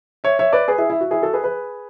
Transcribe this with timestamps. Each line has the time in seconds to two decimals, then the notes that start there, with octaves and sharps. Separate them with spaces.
0.24 C#5 E5
0.39 C#5 E5
0.53 B4 D5
0.68 G#4 B4
0.78 E4 G#4
0.90 E4
1.01 F#4
1.11 E4 G#4
1.22 F#4 A4
1.33 G#4 B4
1.44 G#4 B4